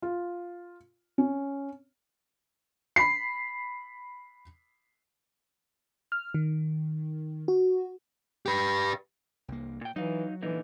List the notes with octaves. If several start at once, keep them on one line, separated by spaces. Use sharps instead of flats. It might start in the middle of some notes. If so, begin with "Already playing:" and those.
F4
C#4
B5 B6 C7
F6
D#3
F#4
G4 B4
C2 A#3
A#2 G5
E3 F#3 D#4 F5
A#2 D3 E3 D#4